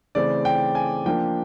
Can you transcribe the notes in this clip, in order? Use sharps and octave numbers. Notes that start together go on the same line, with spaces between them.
C#3 E3 A3 C4 D5
G5
G#5
F3 A#3 D4 G5